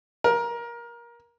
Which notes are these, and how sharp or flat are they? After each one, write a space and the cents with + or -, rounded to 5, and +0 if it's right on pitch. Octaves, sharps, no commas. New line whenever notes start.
A#4 +20